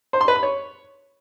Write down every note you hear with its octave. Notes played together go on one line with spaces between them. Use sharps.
C5
C6
B4
B5
C#5